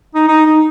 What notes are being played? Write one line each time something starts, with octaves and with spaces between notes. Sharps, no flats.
D#4
D#4
D#4